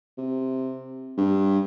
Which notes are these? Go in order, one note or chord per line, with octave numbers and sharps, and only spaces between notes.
C3
G2